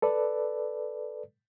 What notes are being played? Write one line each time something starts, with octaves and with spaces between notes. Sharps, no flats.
A4 B4 D5